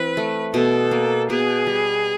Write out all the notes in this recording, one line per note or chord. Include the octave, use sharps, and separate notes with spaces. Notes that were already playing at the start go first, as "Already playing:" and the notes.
Already playing: E3 C4 B4
A3
B2 A4
A#3
B2 G#4
G3